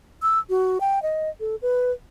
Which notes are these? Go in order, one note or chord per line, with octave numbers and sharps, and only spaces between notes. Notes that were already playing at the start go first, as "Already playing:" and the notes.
E6
F#4
G5
D#5
A4
B4